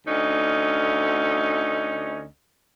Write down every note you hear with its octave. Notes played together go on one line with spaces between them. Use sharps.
D2 C#4 D#4